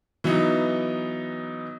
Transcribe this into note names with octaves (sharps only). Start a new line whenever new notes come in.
E3 F#3 B3 D#4